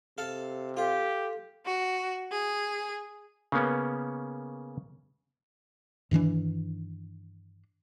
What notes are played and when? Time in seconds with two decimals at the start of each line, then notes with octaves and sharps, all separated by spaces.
0.18 C3 A4 F5
0.77 F4 G4 A4
1.65 F#4
2.31 G#4
3.52 C#3 A#3 B3 C#4
6.11 G2 D#3 E3 D4